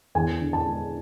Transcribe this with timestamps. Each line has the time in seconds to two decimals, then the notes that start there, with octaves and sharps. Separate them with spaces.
0.15 E2 G#5
0.41 D3
0.53 A5
0.66 G#3